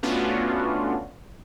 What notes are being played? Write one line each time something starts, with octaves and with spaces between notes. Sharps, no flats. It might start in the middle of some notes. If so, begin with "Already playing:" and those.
A3 B3 C#4 D4 F4 F#4